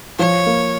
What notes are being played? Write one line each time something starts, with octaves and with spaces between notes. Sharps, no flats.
F3 C#5
A#3